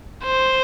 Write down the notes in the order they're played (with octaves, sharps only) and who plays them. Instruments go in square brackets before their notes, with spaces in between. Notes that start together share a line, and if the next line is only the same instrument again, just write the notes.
[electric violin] C5